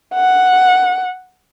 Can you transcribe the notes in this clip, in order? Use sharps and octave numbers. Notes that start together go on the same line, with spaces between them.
F#5